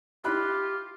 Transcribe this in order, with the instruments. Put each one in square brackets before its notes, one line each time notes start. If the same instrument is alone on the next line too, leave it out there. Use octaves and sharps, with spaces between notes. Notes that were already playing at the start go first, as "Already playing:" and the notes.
[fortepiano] E4 B5 F#6 [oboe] F4 [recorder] G4